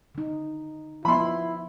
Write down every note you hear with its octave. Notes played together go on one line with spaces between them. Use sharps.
D3 D#4
F3 B3 E4 B5 C6